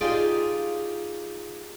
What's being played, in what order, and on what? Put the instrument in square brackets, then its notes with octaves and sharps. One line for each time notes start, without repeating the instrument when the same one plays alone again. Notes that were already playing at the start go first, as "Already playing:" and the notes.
[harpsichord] D#4 F4 G4 G#4 D5